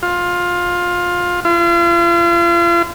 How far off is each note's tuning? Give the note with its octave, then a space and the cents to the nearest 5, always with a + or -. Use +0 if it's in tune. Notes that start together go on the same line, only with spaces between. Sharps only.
F4 +15
F4 -40